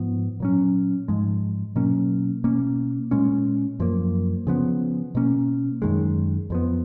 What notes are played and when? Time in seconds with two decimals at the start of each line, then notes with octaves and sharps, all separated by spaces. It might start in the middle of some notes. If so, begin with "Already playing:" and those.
Already playing: G#2 F3 B3
0.40 A#2 F#3 C#4
1.08 G#2 F3 G#3
1.76 B2 F#3 A#3 C#4
2.44 B2 A#3 C#4
3.11 A#2 G#3 C#4
3.80 F#2 F3 A#3
4.47 C#3 F3 B3
5.15 B2 A#3 C#4
5.82 F#2 D#3 G#3
6.50 F2 F3 B3